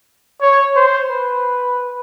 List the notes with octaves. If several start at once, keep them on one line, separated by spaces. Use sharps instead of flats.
C#5
C5
B4